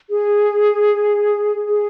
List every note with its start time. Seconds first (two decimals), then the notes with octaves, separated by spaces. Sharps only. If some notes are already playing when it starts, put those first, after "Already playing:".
0.10 G#4
1.69 G#4